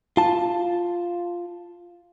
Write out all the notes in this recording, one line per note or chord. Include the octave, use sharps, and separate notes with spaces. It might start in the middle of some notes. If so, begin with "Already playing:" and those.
F4 A5